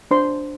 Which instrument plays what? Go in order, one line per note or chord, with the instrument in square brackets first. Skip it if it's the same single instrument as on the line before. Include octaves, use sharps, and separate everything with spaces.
[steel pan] D4 C5 C6